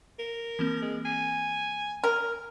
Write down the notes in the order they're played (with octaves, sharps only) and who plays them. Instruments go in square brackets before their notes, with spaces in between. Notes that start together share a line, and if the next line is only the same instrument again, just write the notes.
[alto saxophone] A#4
[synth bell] E3 A#3 C4
[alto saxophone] G#3
G#5
[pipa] A#4